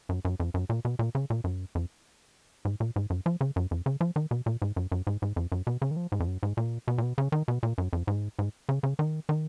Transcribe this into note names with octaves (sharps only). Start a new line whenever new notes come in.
F#2
F#2
F2
F#2
A#2
B2
A#2
C#3
A#2
F#2
F2
G#2
A#2
G#2
F#2
F3
C#3
F#2
F2
C#3
F3
D#3
B2
A#2
G#2
F#2
F#2
G#2
G#2
F2
F#2
B2
C#3
D#3
F3
G#2
F2
F#2
G#2
A#2
B2
A#2
B2
C#3
D#3
B2
A#2
F#2
F2
G#2
G#2
C#3
C#3
D#3
D#3